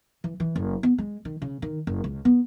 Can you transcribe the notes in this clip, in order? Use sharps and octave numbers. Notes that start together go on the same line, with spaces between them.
E3
E3
F#1
B3
G#3
D#3
C#3
D#3
F#1
C#2
B3